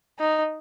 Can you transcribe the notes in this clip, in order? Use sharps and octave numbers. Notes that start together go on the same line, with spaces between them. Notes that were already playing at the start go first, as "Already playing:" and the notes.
D#4